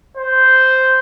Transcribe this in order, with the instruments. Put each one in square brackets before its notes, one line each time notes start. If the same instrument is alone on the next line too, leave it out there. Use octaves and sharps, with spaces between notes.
[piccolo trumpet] C5